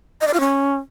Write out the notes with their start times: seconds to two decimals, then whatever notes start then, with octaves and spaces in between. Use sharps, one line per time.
0.21 D#5
0.27 D5
0.34 F4
0.40 C#4